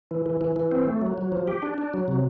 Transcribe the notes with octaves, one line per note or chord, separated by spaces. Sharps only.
E3
E3
E3
E3
C4
A3
F#3
F#3
F3
G4
D4
D4
F#3
C3